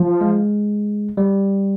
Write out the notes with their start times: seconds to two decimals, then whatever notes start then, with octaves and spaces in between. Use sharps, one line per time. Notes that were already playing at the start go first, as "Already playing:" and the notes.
Already playing: F3
0.21 G#3
1.17 G3